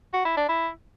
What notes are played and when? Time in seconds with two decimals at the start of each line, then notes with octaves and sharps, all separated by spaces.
0.13 F#4
0.25 E4
0.37 D4
0.49 E4